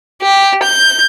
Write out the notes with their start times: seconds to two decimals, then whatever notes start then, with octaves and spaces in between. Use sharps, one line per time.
0.22 G4
0.63 G6